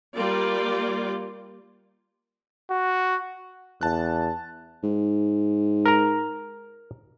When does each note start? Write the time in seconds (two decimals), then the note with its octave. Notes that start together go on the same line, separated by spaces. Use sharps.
0.16 G3 A#3 F4 D5
2.71 F#4
3.81 E2 A5 F#6
4.83 G#2
5.86 A#4 A#5